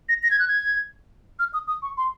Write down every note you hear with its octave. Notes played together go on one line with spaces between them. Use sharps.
A#6
A#6
G#6
F#6
G#6
F6
D#6
D#6
C#6
C6